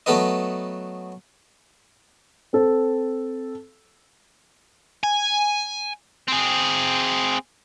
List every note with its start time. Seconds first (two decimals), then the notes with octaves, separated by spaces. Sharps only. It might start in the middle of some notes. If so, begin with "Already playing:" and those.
0.06 F#3 A3 B3 A4 B4 D#5
2.53 C4 A4
5.03 G#5
6.28 C4 G#4